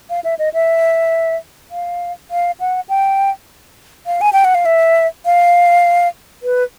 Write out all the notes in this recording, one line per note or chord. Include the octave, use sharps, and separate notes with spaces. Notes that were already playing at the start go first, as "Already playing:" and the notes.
F5
E5
D#5
E5
F5
F5
F#5
G5
F5
G#5
G5
F#5
F5
E5
F5
B4